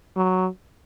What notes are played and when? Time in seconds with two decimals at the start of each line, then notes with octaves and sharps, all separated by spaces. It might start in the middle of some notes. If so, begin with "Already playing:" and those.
0.17 F#3